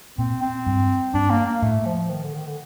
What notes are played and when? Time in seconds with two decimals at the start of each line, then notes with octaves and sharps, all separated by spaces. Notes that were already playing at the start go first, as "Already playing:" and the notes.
0.18 A#2 C4
0.42 C4
0.66 G2
1.14 G2 D4
1.30 A#3
1.46 A#3
1.62 A2 A3
1.86 F3
2.10 D#3
2.23 D3
2.34 D#3
2.46 D3